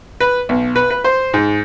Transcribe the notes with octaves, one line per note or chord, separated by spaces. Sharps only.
B4
B1
B4
B4
C5
G#2